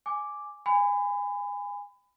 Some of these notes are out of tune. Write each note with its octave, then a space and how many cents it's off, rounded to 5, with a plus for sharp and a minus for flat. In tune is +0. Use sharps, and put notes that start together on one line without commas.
G#5 +5 D6 +0
G#5 -25 B5 +30